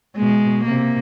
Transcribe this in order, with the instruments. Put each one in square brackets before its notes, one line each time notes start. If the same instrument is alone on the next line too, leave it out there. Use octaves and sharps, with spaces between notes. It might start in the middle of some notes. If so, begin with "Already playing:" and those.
[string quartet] B2 [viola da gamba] G#3
[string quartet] C3 [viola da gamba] A#3